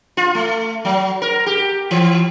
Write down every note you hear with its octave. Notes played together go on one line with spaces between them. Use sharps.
F4
A3
F#3
A#4
G4
E3